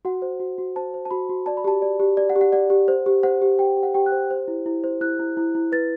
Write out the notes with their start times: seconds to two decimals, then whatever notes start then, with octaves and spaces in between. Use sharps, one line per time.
0.05 F#4 F#5
0.22 C5
0.40 F#4
0.58 F#4
0.76 C5 A5
0.94 C5
1.05 A5
1.11 F#4 B5
1.29 F#4
1.46 D5 A5
1.57 B5
1.64 G4 A5
1.82 D5
2.00 G4
2.17 D5
2.30 F#5
2.36 G4
2.41 F#5
2.52 D5 F#5
2.70 G4
2.88 C5
3.06 G4
3.23 C5 F#5
3.42 G4
3.59 G4 G5
3.77 G4
3.83 F#5
3.94 G4 G5
4.06 F#6
4.12 C5
4.31 C5
4.48 E4
4.66 E4
4.84 C5
5.01 E4 F#6
5.19 E4
5.37 E4
5.55 E4
5.72 B4 A6